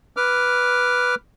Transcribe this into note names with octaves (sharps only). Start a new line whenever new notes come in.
B4 D6 F6